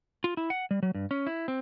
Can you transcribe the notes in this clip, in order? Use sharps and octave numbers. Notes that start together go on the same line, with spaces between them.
F4
E4
F#5
G3
F#3
G2
C#4
E4
C4